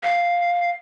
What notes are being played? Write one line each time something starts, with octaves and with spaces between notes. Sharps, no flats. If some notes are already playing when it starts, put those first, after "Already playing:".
F5